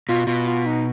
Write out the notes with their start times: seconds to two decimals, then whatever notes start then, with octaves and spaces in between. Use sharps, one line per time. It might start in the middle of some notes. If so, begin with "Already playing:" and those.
0.09 B2 F4
0.27 B2 F4
0.47 F4
0.66 D#4